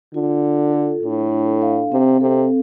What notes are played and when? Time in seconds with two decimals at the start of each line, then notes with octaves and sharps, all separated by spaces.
0.14 D3 F4
0.44 F4
0.73 A4
1.03 A2 D4
1.32 D4
1.62 F5
1.91 C3 C4
2.21 C3 A4